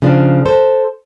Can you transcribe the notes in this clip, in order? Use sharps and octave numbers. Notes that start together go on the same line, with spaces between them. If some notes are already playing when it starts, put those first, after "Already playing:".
C#3 F3 D4
A4 C5